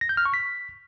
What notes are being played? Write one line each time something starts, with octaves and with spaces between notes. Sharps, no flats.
A#6
G6
F6
C#6
B6